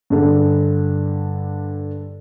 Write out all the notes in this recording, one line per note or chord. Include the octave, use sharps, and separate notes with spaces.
G2 D3